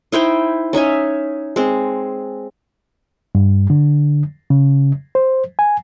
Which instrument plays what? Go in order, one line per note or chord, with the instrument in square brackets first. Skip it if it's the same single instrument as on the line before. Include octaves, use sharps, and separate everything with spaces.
[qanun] D#4 E4 C5 G5
C#4 D#4 E5 G#5
G#3 C4
[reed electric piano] G2
D3
C#3
C5
G#5